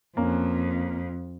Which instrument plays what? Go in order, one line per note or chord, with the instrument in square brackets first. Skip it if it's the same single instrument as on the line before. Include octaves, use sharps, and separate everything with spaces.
[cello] F2 [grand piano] A#3 C#4